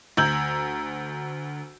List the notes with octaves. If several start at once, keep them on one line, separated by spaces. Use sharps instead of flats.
D2 A#5 E6 G6 G#6 F#7